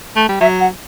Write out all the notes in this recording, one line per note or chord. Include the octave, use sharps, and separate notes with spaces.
A3
G3
F#3 E5
F#5